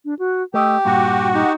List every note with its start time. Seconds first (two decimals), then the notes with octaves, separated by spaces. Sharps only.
0.05 D4
0.19 F#4
0.54 A3 G4 D#5 G5
0.85 G2 A#2 F#4
1.34 D#4 G4